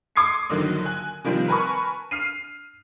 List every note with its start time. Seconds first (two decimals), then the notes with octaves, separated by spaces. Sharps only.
0.16 C6 D6 D#6 G#6 C7 C#7
0.50 A#1 D3 D#3 F#3
0.86 G#5 F#6
1.24 C3 D#3 F3 G3 C4
1.48 A#4 B4 G#5 A5 B5 C#6
2.11 F6 C7 D#7